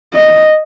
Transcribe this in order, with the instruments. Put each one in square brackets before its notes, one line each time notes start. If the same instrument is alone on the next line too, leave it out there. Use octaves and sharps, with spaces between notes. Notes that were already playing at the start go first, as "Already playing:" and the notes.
[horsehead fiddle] D#5